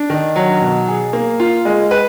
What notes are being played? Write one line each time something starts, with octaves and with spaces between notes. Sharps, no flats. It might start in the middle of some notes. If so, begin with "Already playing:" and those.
Already playing: D4
D#3
F#3
B2
G#4
A#3
F4
G#3
B4